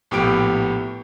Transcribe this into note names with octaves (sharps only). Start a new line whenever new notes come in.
A#1 A2 B3 G4 G5 D7